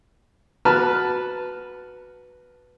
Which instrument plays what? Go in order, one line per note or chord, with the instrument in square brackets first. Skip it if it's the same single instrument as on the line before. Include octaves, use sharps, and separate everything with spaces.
[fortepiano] F#4 B4 A5 F6